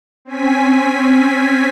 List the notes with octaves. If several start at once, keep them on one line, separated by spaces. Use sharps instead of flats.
C4 C#4 G#5 B6